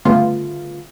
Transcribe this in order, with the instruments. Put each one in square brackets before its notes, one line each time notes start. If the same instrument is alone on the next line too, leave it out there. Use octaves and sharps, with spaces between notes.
[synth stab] G1 C#3 A3 B3 F4